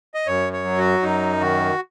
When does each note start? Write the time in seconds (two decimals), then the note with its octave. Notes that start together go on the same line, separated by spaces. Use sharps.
0.14 D#5
0.26 F#2 C#5
0.53 C#5
0.64 F#3
0.78 F#4
1.02 F#2 D#4
1.40 D#3 F#4